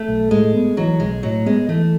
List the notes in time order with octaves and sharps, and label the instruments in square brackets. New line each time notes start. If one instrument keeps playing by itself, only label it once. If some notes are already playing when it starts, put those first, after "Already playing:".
Already playing: [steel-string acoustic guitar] A3
[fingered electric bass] B1
[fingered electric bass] A2 [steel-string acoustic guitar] G#3
[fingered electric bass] B3
[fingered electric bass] E3 [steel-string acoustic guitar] F#3
[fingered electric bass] B1 [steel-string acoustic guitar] G#3
[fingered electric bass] A2 [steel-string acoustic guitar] F#3
[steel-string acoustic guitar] G#3 [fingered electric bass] B3
[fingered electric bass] E3 [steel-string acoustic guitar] A3